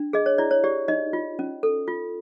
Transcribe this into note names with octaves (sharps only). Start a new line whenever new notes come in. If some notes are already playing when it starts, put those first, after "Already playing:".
Already playing: D4
G#4 D#5
C#5
E4 D5
C#5
G4 D5
D#4 D#5
F4
C#4
A4
F4